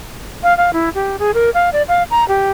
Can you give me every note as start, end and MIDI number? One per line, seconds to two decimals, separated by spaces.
0.43 0.56 77
0.57 0.71 77
0.73 0.89 64
0.95 1.16 67
1.19 1.34 68
1.34 1.50 70
1.54 1.69 77
1.73 1.82 74
1.88 2.03 77
2.10 2.27 82
2.28 2.51 67